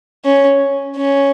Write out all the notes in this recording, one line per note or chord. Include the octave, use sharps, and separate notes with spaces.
C#4
C#4